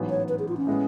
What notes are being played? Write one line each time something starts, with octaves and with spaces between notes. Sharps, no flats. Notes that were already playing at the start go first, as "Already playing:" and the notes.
Already playing: A1 G#2 F#3 B3
C#5
B4
G#4
F4
C#4
A2 G#3 B3